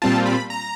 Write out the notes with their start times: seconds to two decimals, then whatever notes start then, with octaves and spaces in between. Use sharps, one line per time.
0.02 A#2 G3 C4 F4 A5
0.26 B5
0.50 A#5